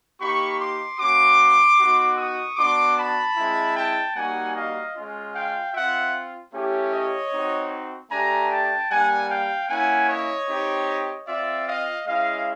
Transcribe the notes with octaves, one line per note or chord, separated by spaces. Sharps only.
A#3 D#4 G4 B5 C#6
C6 D6
A#3 C#4 F#4 C6 D6
B3 D#4 F#4
C#6 D#6
B3 D4 F#4 C6 D6
A5 B5
G#3 C4 E4
G5 A5
G3 A#3 D#4 F#4 F#5 G#5
D#5 F5
G#3 C#4 F4
F5 G5
C4 F4 E5 F#5
A3 C#4 E4 G4
C#5 D#5
C4 D#4 F#4
A3 D4 G4 G#5 A#5
G5 A5
G3 A#3 D4 F#5 G#5
F5 G5
A#3 C#4 E4 F#5 G#5
C#5 D#5
C4 D#4 G4
C4 F4 D5 E5
D#5 F5
G#3 C#4 E4 D#5 F5